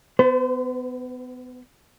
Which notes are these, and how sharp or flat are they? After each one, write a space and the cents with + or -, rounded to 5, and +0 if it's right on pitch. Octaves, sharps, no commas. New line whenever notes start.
B3 +25 C5 -35